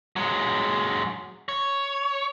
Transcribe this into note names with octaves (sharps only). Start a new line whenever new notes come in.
F#3 G#3
C#5